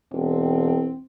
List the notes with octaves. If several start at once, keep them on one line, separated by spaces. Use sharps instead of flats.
E1 C4